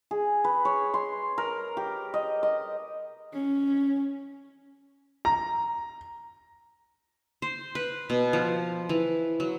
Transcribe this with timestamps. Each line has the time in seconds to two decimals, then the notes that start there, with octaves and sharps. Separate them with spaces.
0.11 G#4
0.44 B4
0.65 C#5
0.94 C6
1.38 A#4
1.77 G4
2.14 D#5
2.43 D#5
3.33 C#4
5.25 A#5
7.42 C5
7.75 B4
8.10 B2
8.33 F3
8.89 E3
9.40 F#3